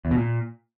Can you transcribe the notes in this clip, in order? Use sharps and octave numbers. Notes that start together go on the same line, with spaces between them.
E2
B2
A#2